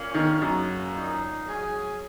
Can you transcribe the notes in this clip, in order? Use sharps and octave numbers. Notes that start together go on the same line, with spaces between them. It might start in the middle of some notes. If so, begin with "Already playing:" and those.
Already playing: A#2 A#3 C#4
D#3
F#2 C#3 A#3 F#4
A#2 A#3 D#4
F#3 C#4 G#4